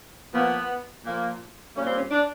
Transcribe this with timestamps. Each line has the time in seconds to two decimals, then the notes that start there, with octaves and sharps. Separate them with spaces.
0.32 A#2 F3 A#3 B3
1.05 A#2 F3 A#3
1.76 A#2 G3 A#3 C#4
1.86 C4
1.95 C#4
2.11 D4